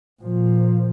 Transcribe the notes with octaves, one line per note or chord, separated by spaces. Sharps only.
A#2 F3